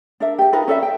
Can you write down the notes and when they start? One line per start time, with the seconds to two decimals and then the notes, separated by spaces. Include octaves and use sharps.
0.20 D4 A#4 E5
0.39 G4 G5
0.53 D#4 F4 A#4 B4
0.68 C#4 A4 D5 E5
0.83 G5